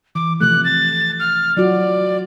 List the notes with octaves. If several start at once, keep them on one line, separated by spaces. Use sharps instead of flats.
E3 D6
C3 F3 A3 F#6
A6
F6
F#3 F4 F#4 D5